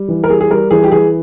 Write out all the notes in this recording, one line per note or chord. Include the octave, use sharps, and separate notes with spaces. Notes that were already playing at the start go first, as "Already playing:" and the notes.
Already playing: G3
E3
A#4
G3 G#4
G#4
G3 A#4
E3 G#4
G4
E3 G#4